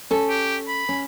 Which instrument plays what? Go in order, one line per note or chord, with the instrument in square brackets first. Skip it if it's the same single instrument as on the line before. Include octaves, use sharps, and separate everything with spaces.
[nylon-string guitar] C#4 A4
[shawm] G4
B5
[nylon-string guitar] C#4